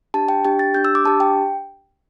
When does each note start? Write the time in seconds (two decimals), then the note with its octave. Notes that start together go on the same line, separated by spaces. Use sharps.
0.14 D4 G4 A5
0.29 G5
0.45 D4 G4 G5
0.59 A6
0.74 D4 G4 G6
0.85 E6
0.95 D6
1.05 D4 G4 A5
1.20 G5